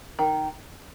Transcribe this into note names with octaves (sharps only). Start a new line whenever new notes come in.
D#3